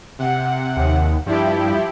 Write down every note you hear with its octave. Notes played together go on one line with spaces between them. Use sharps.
C3 F#5
D#2
G2 F3 E4 G4